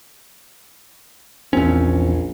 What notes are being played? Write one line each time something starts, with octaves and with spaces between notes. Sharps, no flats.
A#1 E2 C4 C#4